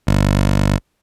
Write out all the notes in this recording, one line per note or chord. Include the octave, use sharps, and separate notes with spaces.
G1